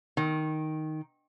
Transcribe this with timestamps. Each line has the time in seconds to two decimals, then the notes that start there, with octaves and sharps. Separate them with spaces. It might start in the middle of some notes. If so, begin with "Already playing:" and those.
0.17 D#3